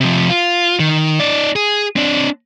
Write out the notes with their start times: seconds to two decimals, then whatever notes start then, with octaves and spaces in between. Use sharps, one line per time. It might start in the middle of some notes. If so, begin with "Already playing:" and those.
0.01 C3 F3
0.30 F4
0.80 D#3
1.20 D#4 D5
1.56 G#4
1.96 C4 D4